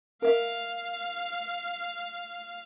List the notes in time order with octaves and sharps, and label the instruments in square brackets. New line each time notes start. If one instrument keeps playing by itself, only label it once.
[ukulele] A#4 E5 [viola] F5